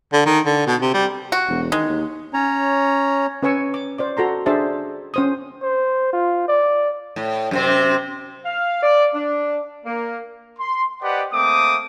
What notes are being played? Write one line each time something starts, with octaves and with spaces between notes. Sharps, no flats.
D3
D#3
D3
B2
C3
G3
F#4
E1
D#3 G#3
D#2
C#4 C#5 A#5
C#4 B4 C#5 G#5 C#6 E6
D6
C5 D5 D6
F#4 A4 A#5 C6
D4 G#4 C5 D5 E5 A5
C#4 C5 D#6
C5
F4
D5
A2
F#2 C3 C4
F5
D5
D4
A#3
C6
G4 B4 C5 D5 D#5 F#5
A3 A#3 C4 D6 D#6